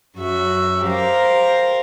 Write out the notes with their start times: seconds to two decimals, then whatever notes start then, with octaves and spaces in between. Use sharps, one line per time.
0.17 F#2 F#4 E5
0.86 G4 A#4 C5 F5